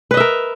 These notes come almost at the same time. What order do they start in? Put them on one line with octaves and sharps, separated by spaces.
B4 D#5 E5 A#4